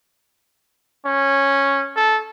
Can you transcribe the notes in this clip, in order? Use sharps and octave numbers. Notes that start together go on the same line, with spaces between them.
C#4
A4